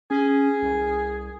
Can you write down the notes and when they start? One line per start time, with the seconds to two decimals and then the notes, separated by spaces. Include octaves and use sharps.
0.11 C#4 G#4
0.63 C2